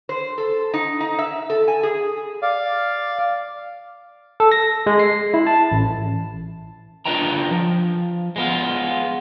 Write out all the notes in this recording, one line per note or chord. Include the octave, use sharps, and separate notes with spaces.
C5
A4
D#4
D#4
E5
A4
G#5
G#4
D5 F5
A4
A#6
G#3
C7
E4
A5
A1
D4 F4 B4 D#5 G5 A#5
F3
G#3 B3 F4